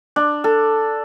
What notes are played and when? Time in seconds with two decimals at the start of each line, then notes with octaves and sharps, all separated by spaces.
0.16 D4
0.44 A4